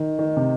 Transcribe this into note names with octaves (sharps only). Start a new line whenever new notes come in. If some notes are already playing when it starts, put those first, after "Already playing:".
Already playing: D#3
D#3
C3